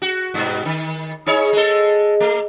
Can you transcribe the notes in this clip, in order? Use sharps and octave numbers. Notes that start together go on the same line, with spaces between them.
F#4
G2 B2
D#3
D#4 G#4 C#5
G#3 A4
A3